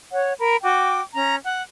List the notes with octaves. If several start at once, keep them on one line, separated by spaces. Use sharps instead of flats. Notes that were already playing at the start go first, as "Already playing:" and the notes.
C#5 F#5
A#4 B5
F#4 G5 D6
C#4 A#5
F#5